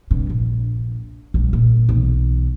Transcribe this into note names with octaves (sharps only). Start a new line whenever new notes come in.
G2 C3
A#1
A#1 G3
A#2
B1 E3